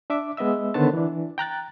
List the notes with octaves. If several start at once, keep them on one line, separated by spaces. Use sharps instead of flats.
D4 E5 D6
G#3 B3 D#5 E5 E6
D3 D#3 B3 C5 C#5 A5
E3 D4
G5 A#5 F#6 A6